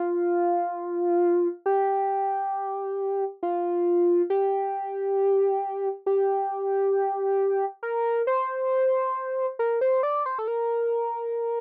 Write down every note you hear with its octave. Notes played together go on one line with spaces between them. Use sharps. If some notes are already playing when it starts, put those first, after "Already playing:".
Already playing: F4
G4
F4
G4
G4
A#4
C5
A#4
C5
D5
C5
A4
A#4